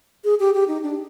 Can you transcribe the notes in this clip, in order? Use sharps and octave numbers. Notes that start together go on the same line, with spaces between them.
G#4
G4
G4
D#4
D4